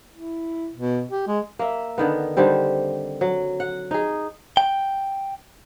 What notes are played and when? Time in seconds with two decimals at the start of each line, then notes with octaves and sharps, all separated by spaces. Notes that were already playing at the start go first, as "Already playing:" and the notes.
0.13 E4
0.75 B2
1.12 G4
1.27 G#3
1.59 A#3 E5
1.98 D3 D#3 B3
2.37 D3 D#3 G3 C4
3.21 F#3
3.60 F#5
3.91 D#4 G#4
4.57 G5